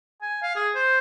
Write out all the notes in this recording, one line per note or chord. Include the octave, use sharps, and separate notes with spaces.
G#5
F5
G#4
C5